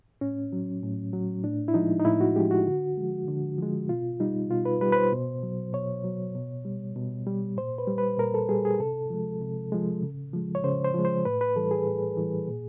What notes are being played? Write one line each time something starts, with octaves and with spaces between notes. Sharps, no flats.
A2 C#4
F#3
A2
F#3
A2 D4
E4
F3 G#3 D#4
D#4
A2 E4
F#4
F3 G#3 G4
F#4
D3
F3 G#3
D3
F3 G#3
B2 F4
G3 D#4
B2 F4
B4
G3 B4
B4
C5
B2
F#3
B2 C#5
F#3
B2
G3
B2
G3
A#2 C5
B4
G3
B4
A#2 A#4
A4
G3 G#4
G#4
C3 A4
F3 G#3
C3
F3 G#3
C#3
F3 G#3
C#5
C#3 C5
C5
F3 G#3
C5
A2 B4
B4
E3 G3 A4
G#4
A2
E3 G3
A#2